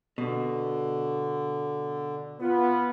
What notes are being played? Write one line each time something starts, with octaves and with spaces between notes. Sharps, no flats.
B2 D3
B3 F4